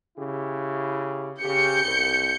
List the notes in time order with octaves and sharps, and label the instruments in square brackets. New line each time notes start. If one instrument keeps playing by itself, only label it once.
[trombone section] C#3 E4 G4
[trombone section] C#3 G4 [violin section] G6 C#7
[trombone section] C2